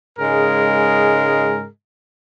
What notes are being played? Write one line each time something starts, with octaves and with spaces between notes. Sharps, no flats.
G#2 C#3 G#3 G#4 A#4